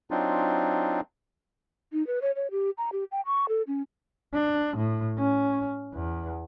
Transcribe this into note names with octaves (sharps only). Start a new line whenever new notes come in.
F#3 C4 D4 D#4 F4
D#4
B4
C#5
C#5
G4
A#5
G4
G5
C#6
A4
C#4
D4
A2
C#4
E2